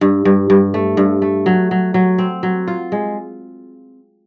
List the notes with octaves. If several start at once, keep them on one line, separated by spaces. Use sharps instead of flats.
G2
G2
G2
A3
G2
A3
F#3
F#3
F#3
C4
F#3
F4
G#3